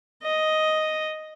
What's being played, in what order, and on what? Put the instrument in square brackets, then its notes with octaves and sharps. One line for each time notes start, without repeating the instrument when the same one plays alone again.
[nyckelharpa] D#5